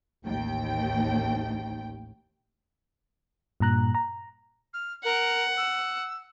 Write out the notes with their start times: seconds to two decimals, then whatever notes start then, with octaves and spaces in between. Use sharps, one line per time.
0.24 A1 D#2 G5
3.60 G2 A#2 A#5 F#6
3.95 A#5
4.74 F6
5.05 A#4 F#5
5.57 E6